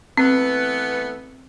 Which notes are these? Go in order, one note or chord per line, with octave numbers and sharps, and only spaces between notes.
E3 A3 B3 C4